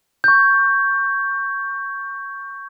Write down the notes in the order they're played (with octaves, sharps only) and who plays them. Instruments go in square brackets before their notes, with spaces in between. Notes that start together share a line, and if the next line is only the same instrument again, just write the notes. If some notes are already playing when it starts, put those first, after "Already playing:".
[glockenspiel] C#6 G6